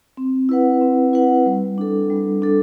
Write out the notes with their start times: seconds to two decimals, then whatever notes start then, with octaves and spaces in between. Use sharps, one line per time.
0.17 C4
0.49 E4 B4 F#5
0.81 C4
1.13 E4 B4 F#5
1.46 G3
1.78 D4 A4
2.10 G3
2.42 D4 A4